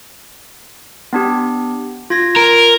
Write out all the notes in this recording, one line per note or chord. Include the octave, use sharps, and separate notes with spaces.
B3 D4 G4
F4 G#6 A#6
A#4